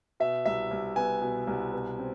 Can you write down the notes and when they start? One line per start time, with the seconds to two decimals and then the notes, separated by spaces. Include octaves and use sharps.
0.20 B2 E5
0.46 C2 E5
0.71 C2
0.96 B3 G#5
1.22 B2
1.47 C2
1.74 B2
1.99 C4